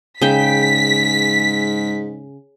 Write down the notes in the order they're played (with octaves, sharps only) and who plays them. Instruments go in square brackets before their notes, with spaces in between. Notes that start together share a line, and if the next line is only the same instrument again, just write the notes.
[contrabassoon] G#2 [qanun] C#3 G5 [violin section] B6